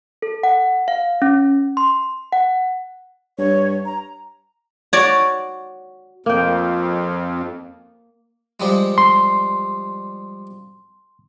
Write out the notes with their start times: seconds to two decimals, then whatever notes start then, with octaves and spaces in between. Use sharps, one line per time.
0.22 A4
0.43 F#5
0.88 F5
1.22 C#4
1.77 C6
2.32 F#5
3.38 G2 C#5
3.85 A#5
4.93 F#4 C#5 D5
6.26 F2 A#3 G5
8.60 F3 G3 G#3
8.98 C6